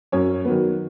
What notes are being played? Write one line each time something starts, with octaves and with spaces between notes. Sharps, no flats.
F#2 C#4 C#5
D#3 F#3 B3